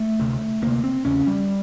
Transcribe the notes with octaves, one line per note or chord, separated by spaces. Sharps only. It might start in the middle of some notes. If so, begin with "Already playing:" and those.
Already playing: A3
D2 C3
D2 C3 A#3
C4
E2 C#3 C#4
G3